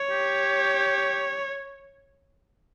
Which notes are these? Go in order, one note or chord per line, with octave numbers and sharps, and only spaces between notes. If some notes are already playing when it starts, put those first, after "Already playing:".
Already playing: C#5
G4